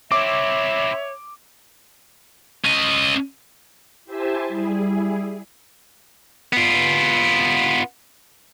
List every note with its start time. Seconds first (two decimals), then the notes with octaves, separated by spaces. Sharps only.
0.12 C4 E4 C#5 E5 D6
2.64 C#4 D#5
4.05 E4 G4 C5 E5 G#5 A5
4.48 G3 E4 G#4
6.53 B3 F4